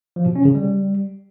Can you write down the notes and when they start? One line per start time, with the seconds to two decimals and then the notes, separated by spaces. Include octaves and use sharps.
0.16 F3
0.26 B2
0.36 C#4
0.45 C#3
0.55 G3